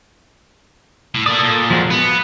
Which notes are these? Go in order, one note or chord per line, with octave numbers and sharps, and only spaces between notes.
A2
A#3 A4 D5 D#6
A#2
F3 G#3 F#4
B3 B4